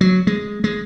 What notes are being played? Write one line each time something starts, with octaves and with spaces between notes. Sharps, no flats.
F#3
G#3
G#3